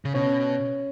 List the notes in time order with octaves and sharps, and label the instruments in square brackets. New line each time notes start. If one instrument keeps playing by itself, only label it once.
[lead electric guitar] C#3
[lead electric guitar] B2 [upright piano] C#4